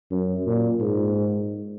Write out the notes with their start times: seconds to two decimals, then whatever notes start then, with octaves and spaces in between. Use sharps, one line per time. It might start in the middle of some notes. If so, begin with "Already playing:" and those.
0.11 F#2
0.46 A#2
0.81 G#2